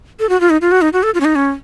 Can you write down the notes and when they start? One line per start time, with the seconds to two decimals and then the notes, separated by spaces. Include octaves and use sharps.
0.20 A4
0.29 F#4
0.40 F4
0.50 D#4
0.61 F4
0.72 F#4
0.82 D#4
0.93 F#4
1.03 A4
1.14 F4
1.20 C#4
1.25 D#4
1.35 C#4